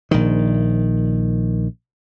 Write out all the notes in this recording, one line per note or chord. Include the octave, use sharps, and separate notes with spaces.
A#1 D#3